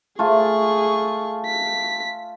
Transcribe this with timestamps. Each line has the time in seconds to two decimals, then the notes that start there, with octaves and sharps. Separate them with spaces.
0.19 A3 F4 G#4 G#5 C#6
1.46 B6